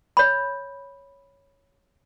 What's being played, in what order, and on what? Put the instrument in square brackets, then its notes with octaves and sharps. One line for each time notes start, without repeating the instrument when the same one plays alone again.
[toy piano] C#5 B5